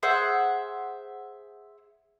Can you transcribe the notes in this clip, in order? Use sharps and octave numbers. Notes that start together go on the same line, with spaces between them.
G#4 C5 E5 F#5